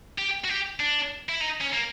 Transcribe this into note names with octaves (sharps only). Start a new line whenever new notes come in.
G4
F#4
G4
D4
E4
D#4
C#4
A#3